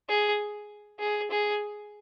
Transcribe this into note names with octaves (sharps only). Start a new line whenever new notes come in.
G#4
G#4
G#4